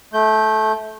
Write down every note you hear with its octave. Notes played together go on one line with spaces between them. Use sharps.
A3 G6